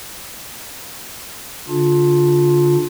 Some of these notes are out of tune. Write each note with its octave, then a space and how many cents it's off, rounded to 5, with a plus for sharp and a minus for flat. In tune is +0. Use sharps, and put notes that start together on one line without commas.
D3 -45 D4 +0 F4 +15